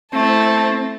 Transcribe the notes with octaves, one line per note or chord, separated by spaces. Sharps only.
A3 C4 E4 A5